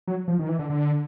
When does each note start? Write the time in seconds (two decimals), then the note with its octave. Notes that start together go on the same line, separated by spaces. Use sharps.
0.08 F#3
0.28 F3
0.39 D#3
0.49 E3
0.59 D3
0.70 D3